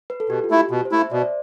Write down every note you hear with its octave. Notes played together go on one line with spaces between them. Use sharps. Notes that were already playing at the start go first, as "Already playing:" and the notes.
B4
A4
B2 G4
F4
A3 E4
G4
B2
C5
A3 E4
E5
B2 D5
C5